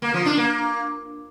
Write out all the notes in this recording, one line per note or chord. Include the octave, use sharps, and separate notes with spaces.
A#3
F3
D4
A#3